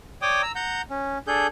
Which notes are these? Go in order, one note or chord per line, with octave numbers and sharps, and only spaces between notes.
C#5 D5 G5 D6 D#6
A#5 E6
F#5 A#5 G6
C#4
D4 G#4 A4 G6